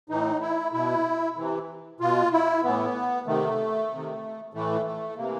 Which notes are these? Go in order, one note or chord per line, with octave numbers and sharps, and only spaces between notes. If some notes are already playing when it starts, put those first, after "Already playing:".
A2 E3 D#4
E4
B2 E4
C3 E3
B2 F4
E4
A2 E3 B3
C3 D#3 A3
C3
D#3
A2 E3 A3
A3
C3 E3 A#3